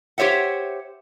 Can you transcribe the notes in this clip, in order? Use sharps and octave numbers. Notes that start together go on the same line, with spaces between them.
G4 C5 C#5 E5 F#5